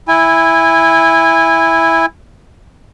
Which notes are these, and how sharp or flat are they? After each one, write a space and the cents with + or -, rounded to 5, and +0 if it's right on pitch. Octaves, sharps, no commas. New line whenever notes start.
E4 +0 G#5 -25